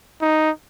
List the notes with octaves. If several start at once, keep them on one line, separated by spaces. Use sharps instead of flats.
D#4